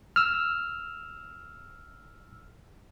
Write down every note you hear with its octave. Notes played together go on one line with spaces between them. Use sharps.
E6 F6